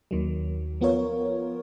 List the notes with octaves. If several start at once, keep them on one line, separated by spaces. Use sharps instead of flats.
D#2 D#3 F#3
F3 B3 F4 A#4 C#5